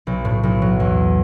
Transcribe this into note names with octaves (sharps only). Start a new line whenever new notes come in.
B1
A2
B1
F#3
E2